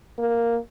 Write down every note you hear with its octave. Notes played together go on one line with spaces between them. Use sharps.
A#3